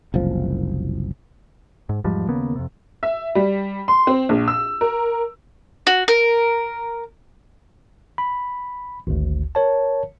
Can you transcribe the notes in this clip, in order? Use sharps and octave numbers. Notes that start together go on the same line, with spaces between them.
F#1 C2 F3
G#2
E2 G#2 F3 G3
D#2 C#3 A#3 B3
F2 C3
E5
G3
C6
C4
A#1
E6
A#4
F#4
A#4
B5
G#1 D2
A#4 C#5 A5